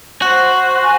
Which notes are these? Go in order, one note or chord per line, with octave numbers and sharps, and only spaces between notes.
F#4 C5
C5
G#5